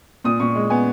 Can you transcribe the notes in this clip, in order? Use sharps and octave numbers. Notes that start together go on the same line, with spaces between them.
A#2 D#6
A#2 C#6
G#3
B3 G#5